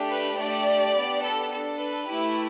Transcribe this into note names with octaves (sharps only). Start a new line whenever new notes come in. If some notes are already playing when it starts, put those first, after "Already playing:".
Already playing: A3 D4 G4
B4
A3 D4 G4 D5
B3 D4 G4
A4
D4 A4
B4
A3 E4 G4